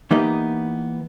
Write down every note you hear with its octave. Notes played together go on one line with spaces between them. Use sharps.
E3 A#3 B3 D#4 G4 D#5